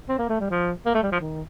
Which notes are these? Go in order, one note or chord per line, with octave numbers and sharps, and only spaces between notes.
C4
A#3
A3
G3
F3
A#3
A3
G3
F3
D#3